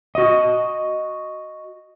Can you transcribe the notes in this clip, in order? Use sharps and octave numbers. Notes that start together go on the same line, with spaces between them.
F#4 D#5